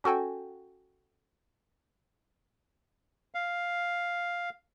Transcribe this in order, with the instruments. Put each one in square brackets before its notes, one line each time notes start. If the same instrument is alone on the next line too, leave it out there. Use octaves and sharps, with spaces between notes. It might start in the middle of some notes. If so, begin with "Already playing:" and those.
[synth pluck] C#4 F#4 A4 G5 G#5
[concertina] F5